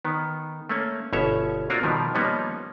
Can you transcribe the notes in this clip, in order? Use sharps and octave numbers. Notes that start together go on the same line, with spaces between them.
D#3 B3
A3 A#3 C#4
G1 B2 C#4 C#5 E5
A#3 C4 D4 F4 F#4 A#4
B2 D#3 F3 G3 B3
F3 G3 A#3 B3 C#4 D#4